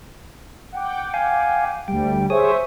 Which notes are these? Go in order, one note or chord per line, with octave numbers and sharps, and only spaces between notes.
F#5 G5 D6
F5 G#5
D2 G3 G5
G#4 C5 C#5 E5 C#6 D#6